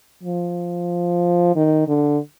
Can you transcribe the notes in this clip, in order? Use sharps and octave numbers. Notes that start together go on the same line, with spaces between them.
F3
D#3
D3